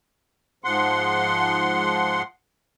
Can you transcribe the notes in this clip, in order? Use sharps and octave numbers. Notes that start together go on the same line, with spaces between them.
G#2 F3 F#5 C6